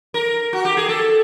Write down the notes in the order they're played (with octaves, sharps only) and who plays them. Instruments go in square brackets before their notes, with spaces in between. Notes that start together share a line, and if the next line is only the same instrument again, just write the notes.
[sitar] A#4
F#4
G4
G#4
A4